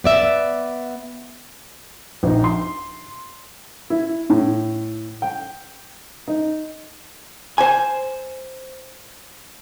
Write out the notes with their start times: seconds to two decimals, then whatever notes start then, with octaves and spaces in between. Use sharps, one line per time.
0.04 B3 D5 E5
2.23 A#1 D#4
2.44 C6
3.90 E4
4.30 A2
5.22 G5
6.28 D#4
7.58 C5 G#5